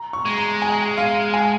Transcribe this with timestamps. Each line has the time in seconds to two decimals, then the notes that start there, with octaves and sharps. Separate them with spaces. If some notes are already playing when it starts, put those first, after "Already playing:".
Already playing: A#5
0.13 C#6
0.26 G#3
0.38 A#5
0.62 G#5
0.98 F5
1.34 G#5